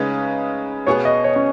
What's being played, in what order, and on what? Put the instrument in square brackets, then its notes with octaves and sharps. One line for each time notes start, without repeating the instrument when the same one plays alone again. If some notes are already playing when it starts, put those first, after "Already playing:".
Already playing: [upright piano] C#3 G#3 D#4 B4 [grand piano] C#4
[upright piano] B2 B3 G#4 [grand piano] C#5
[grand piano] D#5
C#5
C#4